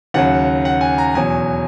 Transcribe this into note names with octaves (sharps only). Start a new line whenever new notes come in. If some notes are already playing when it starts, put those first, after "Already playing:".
D#2 C#3 F#3 F#5
F#5
G#5
A#5
E2 B2 F#3 G#5